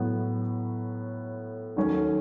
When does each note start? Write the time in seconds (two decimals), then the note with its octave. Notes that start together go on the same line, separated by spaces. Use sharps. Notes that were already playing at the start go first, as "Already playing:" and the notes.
Already playing: A2 F#3 B3
1.76 D#2 D#3 F#3 A3 C#4